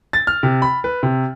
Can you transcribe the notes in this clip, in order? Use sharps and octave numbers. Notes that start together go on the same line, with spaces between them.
A6
F6
C3
B5
B4
C3